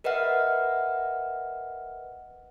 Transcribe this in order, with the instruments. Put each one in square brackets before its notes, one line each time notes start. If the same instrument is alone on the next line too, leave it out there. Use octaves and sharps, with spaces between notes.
[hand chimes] A#4 B4 D#5 E5 F#5 F6